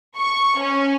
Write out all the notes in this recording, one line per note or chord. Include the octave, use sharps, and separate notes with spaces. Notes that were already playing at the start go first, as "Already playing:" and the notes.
C#6
C#4